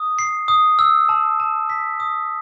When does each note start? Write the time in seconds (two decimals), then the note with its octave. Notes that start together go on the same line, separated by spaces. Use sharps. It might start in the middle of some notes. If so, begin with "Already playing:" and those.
Already playing: D#6
0.19 C7
0.48 D#6
0.79 E6
1.09 A5
1.40 A5
1.70 B6
2.00 D#6